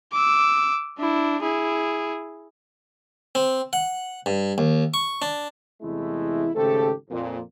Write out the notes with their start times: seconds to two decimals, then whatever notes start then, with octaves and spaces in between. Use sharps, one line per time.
0.12 D6 E6
0.98 D4 E4
1.41 E4 G#4
3.35 C4
3.73 F#5
4.26 G2
4.58 D#2
4.94 C#6
5.22 D4
5.82 E2 C3 G#3 A3 E4
6.56 G#1 C#3 A3 C4 G4 A4
7.10 F2 A#2